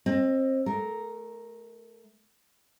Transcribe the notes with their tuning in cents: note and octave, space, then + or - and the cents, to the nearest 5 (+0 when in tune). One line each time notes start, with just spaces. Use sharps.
C4 +25 D#5 +0
A3 -25 A#4 +0